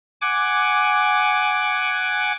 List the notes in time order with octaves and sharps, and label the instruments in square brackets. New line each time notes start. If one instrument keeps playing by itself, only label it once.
[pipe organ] F#5 G#5 D6